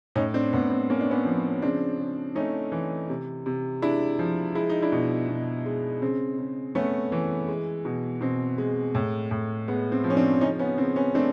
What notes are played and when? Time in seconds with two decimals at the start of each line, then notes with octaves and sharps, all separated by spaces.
0.15 A2 C#4 D#4
0.34 C4 D4
0.53 A2 B3
0.71 C4
0.90 A#3 C#4
1.01 D4
1.11 B3 C#4
1.25 F3
1.62 C#3 C4 D4
1.99 C#3
2.35 A3 C#4 D#4
2.72 E3
3.09 C3
3.46 C3
3.82 G#3 D4 E4
4.19 F3
4.55 G#3 E4
4.70 D#4
4.82 D4 E4
4.92 B2
5.29 B2
5.66 G#3
6.02 C#3 C4
6.38 C#3
6.75 A3 B3 C#4
7.12 E3
7.48 G#3
7.85 B2
8.21 B2 C4
8.58 G#3
8.95 A2
9.31 A2
9.68 G#3 B3
9.92 C4
10.04 F3
10.10 C#4
10.17 C4 D4
10.41 C#3 C#4 D#4
10.59 B3 C#4
10.78 C#3 C4
10.96 B3 C#4
11.15 A3 C4 D4